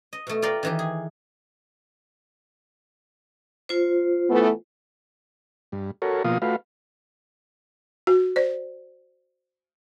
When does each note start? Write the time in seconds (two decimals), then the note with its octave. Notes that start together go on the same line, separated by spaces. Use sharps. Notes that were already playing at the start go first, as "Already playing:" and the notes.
0.13 D#5
0.27 B2 A3
0.42 F4 A#4 D5 F5 G5
0.63 D#3 E3 G4
0.79 G#4
3.69 F4 C5
4.30 E3 A3 B3
5.72 G2
6.02 F#4 A4 A#4 C#5
6.24 B2 F3 A#3 F4 F5 D#6
6.42 A3 F4 F#4 B4 F5
8.07 F#4
8.36 C5 D5